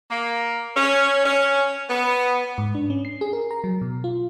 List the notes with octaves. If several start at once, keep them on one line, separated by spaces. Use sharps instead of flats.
A#3
C#4
C#4
B3
G#2
D4
C#4
C7
G#4
A#4
A#5
F#3
B2
F4